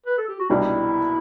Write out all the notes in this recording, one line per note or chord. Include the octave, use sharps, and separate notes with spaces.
B4
A4
G4
F#4
C2 B2 G3 D4 E4 G4